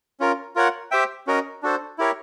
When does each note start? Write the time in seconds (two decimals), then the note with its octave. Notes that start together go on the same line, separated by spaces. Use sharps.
0.20 C#4 F4 A#4
0.56 F4 A#4 C#5 F#5
0.91 G4 C5 E5 G5
1.27 C#4 F#4 A#4 D#5
1.63 D4 F#4 A4 C5
1.98 E4 G4 A#4 C#5